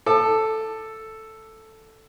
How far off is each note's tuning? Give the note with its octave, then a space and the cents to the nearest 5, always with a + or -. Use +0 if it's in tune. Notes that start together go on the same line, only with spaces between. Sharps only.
A4 +0 D6 +40